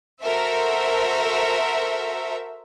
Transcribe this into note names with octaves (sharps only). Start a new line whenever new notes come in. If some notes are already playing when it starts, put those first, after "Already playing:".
F#4 A4 A#4 C5 E5